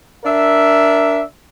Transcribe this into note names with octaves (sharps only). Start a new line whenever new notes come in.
D4 A#4 D5 E5